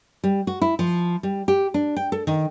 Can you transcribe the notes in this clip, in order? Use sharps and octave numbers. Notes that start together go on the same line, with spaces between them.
G3
F#4
E4
F3
G3
G4
D4
G5
A4
D#3